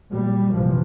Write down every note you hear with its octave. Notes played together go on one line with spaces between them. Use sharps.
A#2 G3
A#1 G2 C3 E3 F3